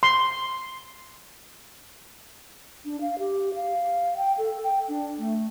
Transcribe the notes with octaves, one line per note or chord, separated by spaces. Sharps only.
C6
D4
F5
G4
F5
G5
A4
G5
D4
A3